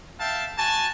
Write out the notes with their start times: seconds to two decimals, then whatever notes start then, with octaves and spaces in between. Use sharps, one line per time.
0.20 E5 F5 G5 A5
0.57 F#4 G#5 A5